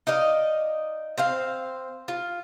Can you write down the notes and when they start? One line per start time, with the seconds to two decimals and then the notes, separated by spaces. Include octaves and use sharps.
0.07 D#4 D5 D#5 F5
1.18 C4 C5 F5
2.08 F4